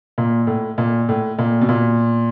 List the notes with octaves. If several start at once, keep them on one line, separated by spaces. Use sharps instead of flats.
A#2
A2
A#2
A2
A#2
B2
A#2